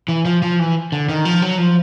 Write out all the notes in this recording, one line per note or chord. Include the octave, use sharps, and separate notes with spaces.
E3
F3
F3
E3
D3
D#3
F3
F#3
F3